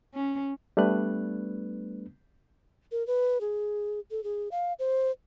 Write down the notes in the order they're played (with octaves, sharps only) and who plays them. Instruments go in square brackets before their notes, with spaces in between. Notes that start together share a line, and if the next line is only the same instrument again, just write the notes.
[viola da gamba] C#4
[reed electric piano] G3 A3 B3 D4 B4 F#6
[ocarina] A#4
B4
G#4
A4
G#4
F5
C5